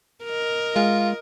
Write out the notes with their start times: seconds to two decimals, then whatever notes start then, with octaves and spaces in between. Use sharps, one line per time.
0.24 A#4 D#5
0.76 G#3 F4